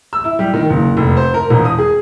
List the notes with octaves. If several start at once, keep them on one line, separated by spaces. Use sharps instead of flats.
E6
E4
G3
D#3
F#1
F1
C5
A#4
E1
D#6
G#4